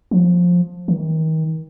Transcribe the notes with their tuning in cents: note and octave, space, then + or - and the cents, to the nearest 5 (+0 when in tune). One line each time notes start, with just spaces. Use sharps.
F3 +15
D#3 +35